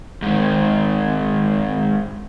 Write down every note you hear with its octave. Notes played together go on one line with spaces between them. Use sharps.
G#2 D#3